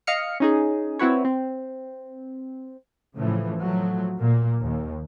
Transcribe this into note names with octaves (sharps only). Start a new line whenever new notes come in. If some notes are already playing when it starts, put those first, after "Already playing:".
D#5 F5 F6 C#7
C#4 D#4 G#4
C4 E4 F#4 B4 C#5
C4
A2 C#3 E3 F3
F3 F#3 A3
A#2 A#3
D#2